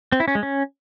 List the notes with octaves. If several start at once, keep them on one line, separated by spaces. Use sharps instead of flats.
C4
E4
C#4
G#3
C#4